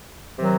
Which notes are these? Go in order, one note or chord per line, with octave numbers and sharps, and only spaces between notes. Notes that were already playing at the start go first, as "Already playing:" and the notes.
C3 D#3 F#3